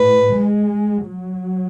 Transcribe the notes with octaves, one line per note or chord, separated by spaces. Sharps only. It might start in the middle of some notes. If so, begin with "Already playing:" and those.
Already playing: A2 B4
G#3
F#3